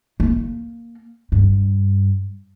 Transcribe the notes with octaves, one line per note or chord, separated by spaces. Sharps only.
A#3
G2